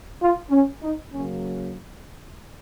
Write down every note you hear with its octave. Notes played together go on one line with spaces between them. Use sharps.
F4
C#4
D#4
C#3 F#3 A#3 C#4